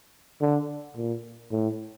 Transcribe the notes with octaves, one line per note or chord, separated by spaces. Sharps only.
D3
A#2
A2